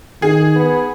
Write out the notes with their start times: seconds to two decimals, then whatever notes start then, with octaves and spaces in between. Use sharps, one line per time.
0.22 D#3 G#4
0.56 B3